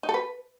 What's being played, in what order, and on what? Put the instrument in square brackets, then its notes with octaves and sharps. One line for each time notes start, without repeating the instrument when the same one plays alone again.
[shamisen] D#4
A4
B4